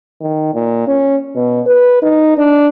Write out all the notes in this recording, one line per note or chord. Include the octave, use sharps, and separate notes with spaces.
D#3
A#2
C#4
B2
B4
D#4
D4